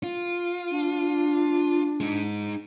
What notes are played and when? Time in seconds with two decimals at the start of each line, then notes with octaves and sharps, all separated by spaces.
0.03 F4
0.71 D4
2.00 G#3 D#4